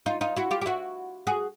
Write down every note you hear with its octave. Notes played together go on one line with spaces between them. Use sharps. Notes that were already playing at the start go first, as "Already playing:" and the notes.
D#4 F4
D#4 F4
E4 F#4
F4 G4
G4
E4 F#4
F#4 G#4